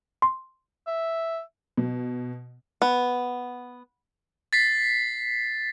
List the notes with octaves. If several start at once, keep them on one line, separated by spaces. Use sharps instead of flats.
C6
E5
B2
B3
A6 B6 C7